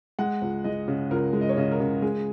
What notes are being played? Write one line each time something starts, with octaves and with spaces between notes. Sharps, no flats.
G#3 F#5
C#2
G#3 D#5
C#3
C#2 A#4
G#3
D#5
C#5
C#3 D#5
A#4
C#3
G#3 G#4